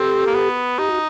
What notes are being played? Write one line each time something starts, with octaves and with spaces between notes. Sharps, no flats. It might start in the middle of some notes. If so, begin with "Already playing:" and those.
Already playing: C4 G4 A4
A#3
B3
D#4 G4
F#4